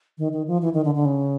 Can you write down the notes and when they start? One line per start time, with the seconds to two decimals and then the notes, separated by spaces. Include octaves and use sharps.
0.18 D#3
0.33 D#3
0.47 F3
0.62 E3
0.74 D#3
0.85 D3
0.95 D3
1.05 C#3